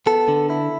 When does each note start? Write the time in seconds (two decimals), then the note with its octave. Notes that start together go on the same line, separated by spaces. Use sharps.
0.06 B3 A4
0.28 D3
0.50 E4